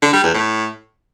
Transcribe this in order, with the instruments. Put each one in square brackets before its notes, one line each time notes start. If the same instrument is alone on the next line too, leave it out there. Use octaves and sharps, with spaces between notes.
[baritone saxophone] D3
G3
E2
A2